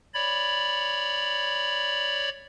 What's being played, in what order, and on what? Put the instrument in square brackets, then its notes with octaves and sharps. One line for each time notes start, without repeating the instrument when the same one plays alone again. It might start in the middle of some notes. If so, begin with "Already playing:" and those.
[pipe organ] C#5 D5 B5